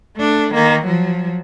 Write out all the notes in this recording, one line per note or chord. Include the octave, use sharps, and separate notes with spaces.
A3 D4
D#3 A#3
F3 F#3